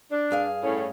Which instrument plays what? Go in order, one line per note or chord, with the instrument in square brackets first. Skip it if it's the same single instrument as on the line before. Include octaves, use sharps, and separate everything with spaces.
[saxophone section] D4
[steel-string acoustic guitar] G2 G#4 F5
[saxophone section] A2 C#4